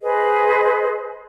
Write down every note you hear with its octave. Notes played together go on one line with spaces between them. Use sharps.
G#4 B4 C5 D#5